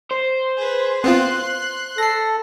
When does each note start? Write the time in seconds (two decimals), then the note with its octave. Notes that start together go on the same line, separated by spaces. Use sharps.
0.11 C5
0.57 G#4 B4
1.04 B3 C4 F4 C6 F#6
1.98 A4 A#6 C7